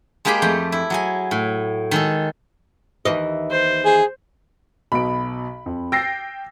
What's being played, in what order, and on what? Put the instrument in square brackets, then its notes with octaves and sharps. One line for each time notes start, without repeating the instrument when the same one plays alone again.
[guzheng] G#3 A#3 G4 G#4 G5 B5
F2 A3 G5
E4
F#3 G#4 G#5
A2
D#3 G#3 A4
[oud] D#2 E3 D#5
[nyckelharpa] C5
[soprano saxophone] G#4
[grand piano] B1 B2 D7 [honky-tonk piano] B5
[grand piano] F2
[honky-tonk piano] G5 A#6 C7 [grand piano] E6 A6